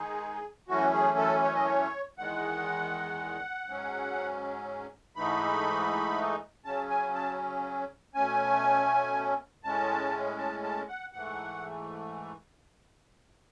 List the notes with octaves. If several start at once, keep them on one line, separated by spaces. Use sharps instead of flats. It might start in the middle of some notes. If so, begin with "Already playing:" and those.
Already playing: D#3 G#3 D#4 G#4
F#2 E3 A3 C#4 F#4
G#4
A4
C#5
D#5
C#5
E2 D#3 G#3 F#5
G#2 F#3 C#4
G#2 E3 A3 D#4 B5
C#3 F#3 C#4 A5
G#5
A5
B2 A3 C#4 G#5
A2 G#3 C#4 A5
A5
A5
F#5
G#2 E3 A3 F#5